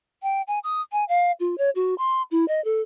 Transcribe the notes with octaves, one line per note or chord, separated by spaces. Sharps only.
G5
G#5
D#6
G#5
F5
F4
C#5
F#4
C6
E4
D#5
A4